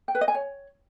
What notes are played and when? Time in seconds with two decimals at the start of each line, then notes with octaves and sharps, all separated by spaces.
0.08 G5
0.15 B4
0.21 D#5
0.28 G#5
0.34 C#5